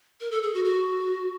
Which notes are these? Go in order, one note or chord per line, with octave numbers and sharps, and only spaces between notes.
A#4
A4
G#4
F#4
F#4